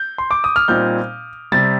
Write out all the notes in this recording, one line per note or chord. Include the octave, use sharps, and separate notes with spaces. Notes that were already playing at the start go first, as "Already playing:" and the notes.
Already playing: G6
C6
D6
D#6
F6
A#2 G3 C4 D#4 G6
C3 G3 A6